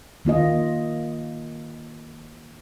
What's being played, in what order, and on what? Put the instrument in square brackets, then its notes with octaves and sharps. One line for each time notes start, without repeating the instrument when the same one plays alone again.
[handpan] D#3 A#3 F4 D#5